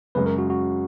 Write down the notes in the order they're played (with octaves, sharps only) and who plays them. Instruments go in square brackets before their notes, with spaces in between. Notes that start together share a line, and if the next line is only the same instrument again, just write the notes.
[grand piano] F#2 C#3 G#3 [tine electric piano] B4
[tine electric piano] A#4
F#4
F#4